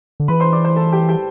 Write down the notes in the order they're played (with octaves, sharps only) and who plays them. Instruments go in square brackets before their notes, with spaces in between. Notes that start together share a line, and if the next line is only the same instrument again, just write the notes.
[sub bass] D3
[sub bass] E3 [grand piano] B4 B5
[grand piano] C5 C6
D5 D6
C5 C6
A4 A5
G4 G5
G4 G5